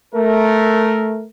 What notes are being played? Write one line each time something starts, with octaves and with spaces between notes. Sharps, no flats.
A3 A#4